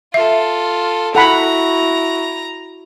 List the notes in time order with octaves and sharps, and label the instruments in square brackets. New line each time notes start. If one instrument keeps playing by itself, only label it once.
[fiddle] F4 A4 [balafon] E5
[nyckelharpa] E4 F#4 [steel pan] A4 F#5 B5 [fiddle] A#5